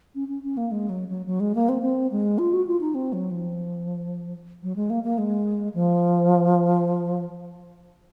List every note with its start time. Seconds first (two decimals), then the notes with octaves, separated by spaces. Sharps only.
0.15 C#4
0.28 C#4
0.43 C#4
0.57 A#3
0.71 G#3
0.89 F#3
1.09 F#3
1.26 F#3
1.40 G#3
1.55 A#3
1.69 C4
1.82 C4
2.11 G#3
2.38 F4
2.53 F#4
2.67 F4
2.81 D#4
2.95 C4
3.13 F#3
3.31 F3
4.63 F#3
4.76 G#3
4.90 A#3
5.04 A#3
5.18 G#3
5.74 F3